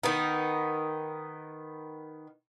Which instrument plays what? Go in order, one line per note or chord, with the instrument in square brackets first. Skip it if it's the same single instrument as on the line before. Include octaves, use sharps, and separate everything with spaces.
[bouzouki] D#3 B3 D#4